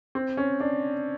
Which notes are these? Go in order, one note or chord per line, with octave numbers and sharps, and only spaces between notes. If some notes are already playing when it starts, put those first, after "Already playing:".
C4
C#4
D4